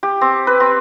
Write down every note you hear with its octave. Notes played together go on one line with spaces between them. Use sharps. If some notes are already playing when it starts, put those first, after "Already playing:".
G4
C4
B4
C4